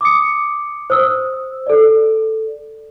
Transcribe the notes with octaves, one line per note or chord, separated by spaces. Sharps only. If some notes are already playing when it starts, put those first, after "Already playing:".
D6 D#6 C#7
C5 D#6 E6
A4 D5